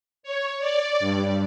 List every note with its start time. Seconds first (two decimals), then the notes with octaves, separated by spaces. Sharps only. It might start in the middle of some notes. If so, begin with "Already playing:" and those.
0.23 C#5
0.60 D5
1.00 G2